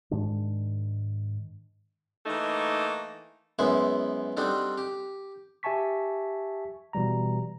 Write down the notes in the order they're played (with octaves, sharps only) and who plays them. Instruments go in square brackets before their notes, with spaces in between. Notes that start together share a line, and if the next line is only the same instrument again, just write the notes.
[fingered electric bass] G#2 D#3 G#3 D4
[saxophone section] E3 A3 A#3 D#4
[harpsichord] F#2 G#3 B3 E4 C5 C#6
G3 C4 D4 D#4 F#4 A4
G4
[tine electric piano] G4 E5 G#5 A5 C#6 B6
B2 E3 G3 A#5